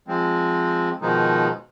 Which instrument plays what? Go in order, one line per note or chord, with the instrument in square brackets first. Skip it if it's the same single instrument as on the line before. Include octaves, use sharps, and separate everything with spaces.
[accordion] F3 G#3 C4
B2 D#3 F3 G#3 D#4